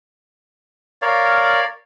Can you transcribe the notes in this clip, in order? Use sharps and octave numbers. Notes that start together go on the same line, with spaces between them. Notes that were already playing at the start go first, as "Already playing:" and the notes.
A#4 C#5 D5 F5